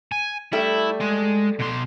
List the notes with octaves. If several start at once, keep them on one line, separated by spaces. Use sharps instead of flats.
G#5
G3 A3 E4
G#3 C6
B2 C6